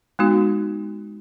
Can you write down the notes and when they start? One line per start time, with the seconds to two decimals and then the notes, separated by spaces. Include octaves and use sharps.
0.19 G#3 B3 D#4 F#4